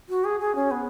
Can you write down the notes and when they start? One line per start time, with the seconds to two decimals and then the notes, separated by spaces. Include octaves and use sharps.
0.09 F#4
0.25 G#4
0.40 G#4
0.55 C#4
0.71 B3